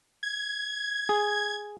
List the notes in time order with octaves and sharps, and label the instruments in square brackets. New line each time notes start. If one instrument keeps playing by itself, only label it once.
[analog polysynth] G#6
[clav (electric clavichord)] G#4